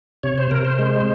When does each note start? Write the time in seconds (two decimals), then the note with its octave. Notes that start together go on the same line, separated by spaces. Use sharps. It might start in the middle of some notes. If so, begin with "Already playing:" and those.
0.23 C3 C#5
0.38 C5
0.51 C3 A#4
0.65 C5
0.79 G#3